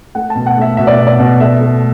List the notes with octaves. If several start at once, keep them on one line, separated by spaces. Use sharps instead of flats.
A3 F#5
A5
B2
F#5
A3 E5
B2 E5
D5
B2
D5
B2
A3 E5
A3